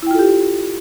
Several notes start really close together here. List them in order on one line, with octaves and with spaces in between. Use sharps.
E4 G5 F4 A4 G4